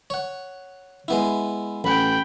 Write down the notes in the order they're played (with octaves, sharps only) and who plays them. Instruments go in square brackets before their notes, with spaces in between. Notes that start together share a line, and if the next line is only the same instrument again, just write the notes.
[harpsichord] C#5 F#5
G#3 B3 E4
[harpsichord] A1 F#5 [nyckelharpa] G5 B5